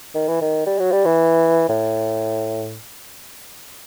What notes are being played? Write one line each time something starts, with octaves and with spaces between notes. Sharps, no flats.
D#3
E3
D#3
G3
F#3
G3
E3
A2